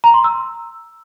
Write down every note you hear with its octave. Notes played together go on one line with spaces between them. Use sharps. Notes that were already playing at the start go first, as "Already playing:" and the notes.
A#5
C6
E6